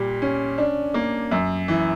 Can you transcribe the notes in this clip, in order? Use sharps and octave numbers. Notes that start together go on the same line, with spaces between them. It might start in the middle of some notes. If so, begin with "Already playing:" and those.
Already playing: A#2 G3 G4
C#4
D4
A#3
F#2
E3